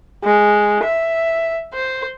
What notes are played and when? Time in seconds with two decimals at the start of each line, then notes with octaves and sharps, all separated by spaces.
0.24 G#3
0.84 E5
1.73 C5